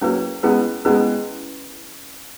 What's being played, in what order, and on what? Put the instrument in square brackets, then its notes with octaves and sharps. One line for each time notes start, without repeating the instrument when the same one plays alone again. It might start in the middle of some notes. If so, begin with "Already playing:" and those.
[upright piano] F#3 A#3 [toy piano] C#4 E4 G#4 B4
[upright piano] G#3 B3 [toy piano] C#4 E4 G#4 B4
[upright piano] G#3 B3 [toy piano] C#4 E4 G#4 B4